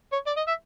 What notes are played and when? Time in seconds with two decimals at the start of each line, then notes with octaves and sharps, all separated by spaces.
0.13 C#5
0.27 D5
0.37 D#5
0.47 E5